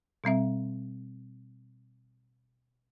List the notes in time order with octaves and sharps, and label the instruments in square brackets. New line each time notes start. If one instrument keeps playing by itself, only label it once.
[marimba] B2 G3 C4 E5